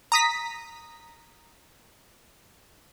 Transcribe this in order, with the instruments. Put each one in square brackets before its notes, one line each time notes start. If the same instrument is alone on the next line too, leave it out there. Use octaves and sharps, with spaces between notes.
[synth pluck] A#5 D#6 B6